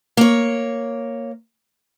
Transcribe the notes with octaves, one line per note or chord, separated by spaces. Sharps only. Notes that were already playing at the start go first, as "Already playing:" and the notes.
A#3 C#5